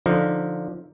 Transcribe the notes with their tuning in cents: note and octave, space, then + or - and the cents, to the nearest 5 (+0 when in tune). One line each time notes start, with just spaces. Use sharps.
D3 +0 F3 +5 D#4 -15